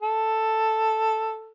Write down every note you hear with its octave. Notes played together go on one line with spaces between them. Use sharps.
A4